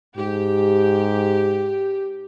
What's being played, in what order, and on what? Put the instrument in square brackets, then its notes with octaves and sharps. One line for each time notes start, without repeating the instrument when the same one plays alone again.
[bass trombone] G#2 [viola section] G4